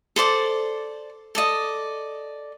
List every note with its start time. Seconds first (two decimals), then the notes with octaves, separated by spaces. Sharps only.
0.16 A4 C5 D5 D6
1.35 A4 D5 D#5